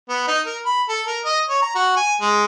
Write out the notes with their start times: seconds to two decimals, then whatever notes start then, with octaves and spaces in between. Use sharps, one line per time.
0.09 B3
0.28 D#4
0.46 A#4
0.65 B5
0.89 A4
1.07 A#4
1.25 D#5
1.49 C#5
1.62 A#5
1.75 F#4
1.97 G#5
2.21 G#3